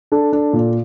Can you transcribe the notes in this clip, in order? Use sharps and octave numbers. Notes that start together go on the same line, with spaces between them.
D4 A4
D4
A#2